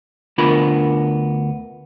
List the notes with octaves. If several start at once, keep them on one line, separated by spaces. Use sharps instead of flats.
D2 B3 D4 F4 A#4 B5